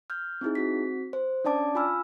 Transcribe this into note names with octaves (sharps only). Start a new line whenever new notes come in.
F6 G6
C4 D#4 E4 G#4
C4 F#4 B6
C5
C#4 D4 D5 A5 D6
F4 G#5 B5 E6 F6